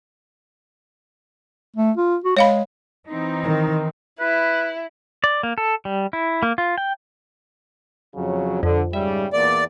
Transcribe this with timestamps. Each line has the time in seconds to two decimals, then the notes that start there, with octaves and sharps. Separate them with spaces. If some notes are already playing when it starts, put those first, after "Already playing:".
1.76 A3
1.97 F4
2.24 F#4
2.37 G#3 C#5 F5 B5
3.06 E3 C4 D#4
3.43 D#3
4.20 E4 B4
5.24 D5
5.43 A#3
5.58 A4
5.85 G3
6.13 E4
6.43 A#3
6.58 F4
6.78 G5
8.16 F2 C#3 F#3
8.63 F2 D3
8.93 G#2 C#3 G3 E5
9.33 E2 A#2 D5